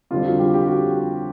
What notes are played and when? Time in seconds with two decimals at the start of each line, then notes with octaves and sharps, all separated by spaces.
0.11 F2 D3 G3 F4
0.25 F#4
0.39 G4
0.54 G4
0.68 F#4